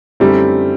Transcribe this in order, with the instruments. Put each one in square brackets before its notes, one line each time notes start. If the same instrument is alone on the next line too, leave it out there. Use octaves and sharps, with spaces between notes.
[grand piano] F#2 D3 A3 C4 E4 [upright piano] G3